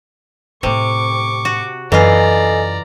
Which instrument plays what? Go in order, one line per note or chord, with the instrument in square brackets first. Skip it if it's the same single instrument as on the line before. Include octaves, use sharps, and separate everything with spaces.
[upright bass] A2 A3 [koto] C3 [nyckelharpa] C#6 D6
[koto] F#4
[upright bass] F#2 [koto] E3 F4 [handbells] A4 D#5 G#5 [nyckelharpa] D5 A#5